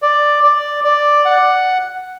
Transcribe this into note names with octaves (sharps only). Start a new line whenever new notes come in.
D5
D5
D5
F#5